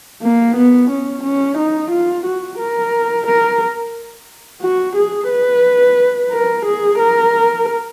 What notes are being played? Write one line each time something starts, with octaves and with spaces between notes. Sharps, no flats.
A#3
B3
C#4
C#4
D#4
F4
F#4
A#4
A#4
F#4
G#4
B4
A#4
G#4
A#4